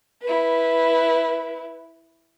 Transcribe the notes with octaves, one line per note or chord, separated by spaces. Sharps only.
E4 B4